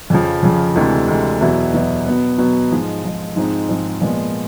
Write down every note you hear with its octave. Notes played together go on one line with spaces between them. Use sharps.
F2 C#3 F3
F2 C#3 F3
D2 C3 E3 G#3
D2 C3 E3 G#3
E2 B2 F#3 B3 E4
E2 B2 F#3 B3 E4
B2 F#3 B3
B2 F#3 B3
G#2 F3 G#3
G#2 F3 G#3
G#2 F3 G#3 C4 D#4
G#2 F3 G#3 C4 D#4
A#2 F3 G#3 B3